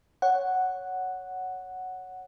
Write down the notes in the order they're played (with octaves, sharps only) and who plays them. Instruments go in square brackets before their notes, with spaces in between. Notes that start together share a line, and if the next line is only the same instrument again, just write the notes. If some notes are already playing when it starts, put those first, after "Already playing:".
[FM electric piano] C#5 F#5